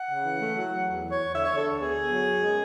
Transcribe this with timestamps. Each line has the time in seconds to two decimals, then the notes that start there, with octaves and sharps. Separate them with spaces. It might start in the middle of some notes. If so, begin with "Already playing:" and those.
Already playing: F#5
0.09 C#3
0.24 E3
0.39 A3
0.55 F#3
0.71 F#3
0.86 E2
1.02 E3
1.10 C#5
1.18 E2
1.34 D3 E5
1.45 D3 C#5
1.57 A4
1.64 D2
1.80 B3 G#4
1.96 B3
2.11 F#3
2.28 F#2
2.43 G#3